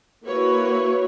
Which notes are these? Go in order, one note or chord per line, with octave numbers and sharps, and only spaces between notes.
A#3 E4 F#4 B4 C#5